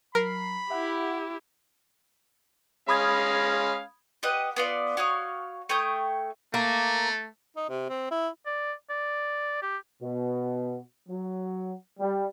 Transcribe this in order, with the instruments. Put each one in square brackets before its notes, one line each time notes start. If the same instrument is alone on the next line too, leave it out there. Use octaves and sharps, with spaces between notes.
[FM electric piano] F#3 A#5 C7 [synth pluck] A#4 [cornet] B5
[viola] E4 G4 [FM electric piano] E5 F#5
[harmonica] G#3 C#4 F5 [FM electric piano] B5 D#6 G#6
[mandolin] G4 B4 D#5 F#5
B3 F4 D5
F#4 C#5 F5 D#6
A3 C#5 G5 D#6
[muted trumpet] A3 [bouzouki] A#3
[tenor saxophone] D#4
C3
C4
E4
[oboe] D5
D5
G4
[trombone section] B2
F#3
G3